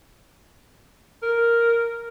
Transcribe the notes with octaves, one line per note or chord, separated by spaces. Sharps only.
A#4